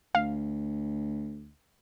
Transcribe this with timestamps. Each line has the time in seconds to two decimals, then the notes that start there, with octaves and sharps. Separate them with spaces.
0.15 D2 F5